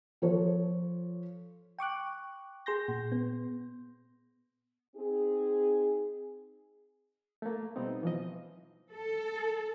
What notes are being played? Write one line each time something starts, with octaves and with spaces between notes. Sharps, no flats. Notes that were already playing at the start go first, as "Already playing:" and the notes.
F3 A4 C#5
G5 C#6 D6 F#6
G#4 C6 G6 A#6
A#2
B3
C4 D#4 G#4
A3 A#3
B2 G3 B3 C4 D#4
E3 F3 D#5
A4